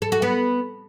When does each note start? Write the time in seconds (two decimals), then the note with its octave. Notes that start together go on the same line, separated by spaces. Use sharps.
0.02 A4
0.12 F#4
0.22 B3